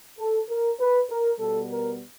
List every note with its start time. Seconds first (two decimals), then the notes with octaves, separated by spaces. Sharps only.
0.19 A4
0.50 A#4
0.80 B4
1.10 A#4
1.39 B2 G3 B3 A4
1.70 A#4